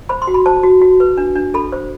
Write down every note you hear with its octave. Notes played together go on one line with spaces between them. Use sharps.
C5 B5
C6
F#4
B5
C5 A5
F#4
F#4
B4
D4
D4
A4 B5
C5